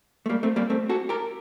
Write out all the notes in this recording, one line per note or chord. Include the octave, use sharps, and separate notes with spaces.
A3
G3 A#3
A3 C4
G3 A#3
A3 C4
F#4 A4
G4 A#4